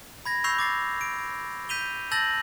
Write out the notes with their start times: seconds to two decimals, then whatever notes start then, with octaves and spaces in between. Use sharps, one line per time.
0.25 B5 G#6 A#6
0.44 B5 C#6 E6 G6 C7 F7
0.59 D6 A6 C7
1.01 D7
1.69 G6 B6 D#7 F7 G7
2.11 A5 E6 G6 A6 A#6 F#7